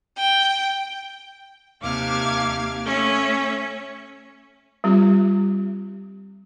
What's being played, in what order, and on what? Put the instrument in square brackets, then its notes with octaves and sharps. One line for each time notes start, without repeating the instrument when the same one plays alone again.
[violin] G5
[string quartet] D#2 C3 F5 D6 F6 G#6
A3 C#4 C#5 E5
[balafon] G3 C4 F4 G4